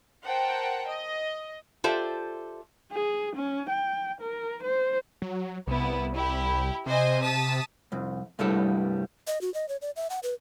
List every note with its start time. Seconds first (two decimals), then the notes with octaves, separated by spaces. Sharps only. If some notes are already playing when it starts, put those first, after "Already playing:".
0.24 A#4 C5 F#5 G5 A5
0.88 D#5
1.84 F4 G4 A4 C5 D5 E5
2.92 G#4
3.35 C#4
3.69 G5
4.21 A#4
4.63 C5
5.22 F#3
5.67 C2 B3 E4
6.14 E4 G4
6.86 C3 C5 D#5 G#5
7.23 A5 D#6 B6
7.92 C2 F2
8.39 C2 G2 G3 A3 E4 A4
9.27 D#5
9.41 F#4
9.54 D#5
9.69 C#5
9.82 D5
9.96 E5
10.10 F#5
10.23 B4